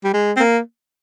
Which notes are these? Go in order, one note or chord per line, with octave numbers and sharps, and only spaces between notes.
G3
G#3
C4
A#3